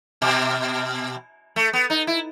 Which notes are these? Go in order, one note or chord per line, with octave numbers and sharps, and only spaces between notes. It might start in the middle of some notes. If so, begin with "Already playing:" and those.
B2
A3
B3
D#4
E4